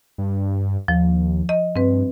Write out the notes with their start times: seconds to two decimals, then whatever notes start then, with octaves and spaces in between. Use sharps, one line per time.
0.18 G2
0.88 D#2 F3
1.49 D#5
1.76 G2 C4 B4